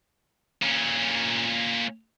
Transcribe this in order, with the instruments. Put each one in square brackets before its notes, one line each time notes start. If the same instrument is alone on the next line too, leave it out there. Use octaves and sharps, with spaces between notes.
[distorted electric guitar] A#2 C#4